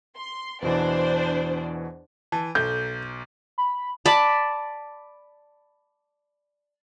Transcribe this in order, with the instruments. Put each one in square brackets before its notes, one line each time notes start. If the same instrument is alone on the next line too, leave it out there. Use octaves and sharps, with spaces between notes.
[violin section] C6
[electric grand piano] E2 B2 E3 [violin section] D4 C5 D5
[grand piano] E3 [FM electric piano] A5
[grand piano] B1 [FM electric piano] A4 [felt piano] G6
[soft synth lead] B5
[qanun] D5 A5 B5